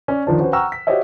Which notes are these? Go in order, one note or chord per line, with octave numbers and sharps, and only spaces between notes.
C#4 C#5 D5
D#3 F3 D4
C#4 F#4 B4 C5
F#5 G5 A#5 C#6 E6 F6
B6
F#4 G4 C5 C#5 D#5 E5